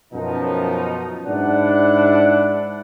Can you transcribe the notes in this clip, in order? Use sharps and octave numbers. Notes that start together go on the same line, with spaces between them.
F#2 B2 F3 D#4
G#2 D4 E4 F#5